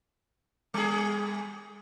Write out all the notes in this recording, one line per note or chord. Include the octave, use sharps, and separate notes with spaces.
G3 G#4